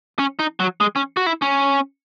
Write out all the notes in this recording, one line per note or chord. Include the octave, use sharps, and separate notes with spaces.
C#4
D#4
F#3
G#3
C#4
F#4
E4
C#4